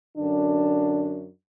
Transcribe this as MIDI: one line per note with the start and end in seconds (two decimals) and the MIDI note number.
0.17 1.27 42
0.17 1.27 50
0.17 1.27 62